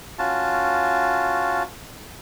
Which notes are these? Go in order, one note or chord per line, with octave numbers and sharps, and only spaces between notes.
C#4 F4 F#4 A5